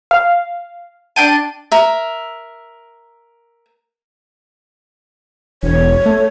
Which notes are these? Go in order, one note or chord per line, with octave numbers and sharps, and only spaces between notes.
F5
D4 G5 A5 D#7
A#4 E5
E1 C#5
A3